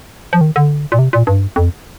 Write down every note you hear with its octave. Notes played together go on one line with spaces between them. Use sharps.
F3
D#3
D3
A#2
C3
A#2
G2
F2